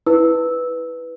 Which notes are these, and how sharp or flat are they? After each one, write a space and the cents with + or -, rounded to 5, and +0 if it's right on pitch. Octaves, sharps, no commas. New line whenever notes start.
E4 -10 B4 +0 E6 -10